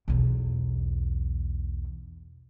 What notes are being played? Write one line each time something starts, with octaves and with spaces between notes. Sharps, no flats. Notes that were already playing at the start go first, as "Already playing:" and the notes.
B1 E2